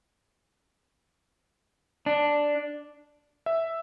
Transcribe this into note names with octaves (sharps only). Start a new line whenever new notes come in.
D4
E5